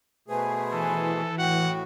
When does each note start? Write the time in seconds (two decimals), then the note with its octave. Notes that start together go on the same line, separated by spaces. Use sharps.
0.28 B2 A3 G#4 B4 C5 G#5
0.72 E3 A4
1.38 A2 F#4 F#5 G5